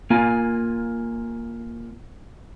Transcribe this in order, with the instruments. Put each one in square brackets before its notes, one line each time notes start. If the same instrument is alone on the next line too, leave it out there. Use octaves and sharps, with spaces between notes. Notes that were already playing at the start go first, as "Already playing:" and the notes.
[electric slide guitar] A#3 F4 G#5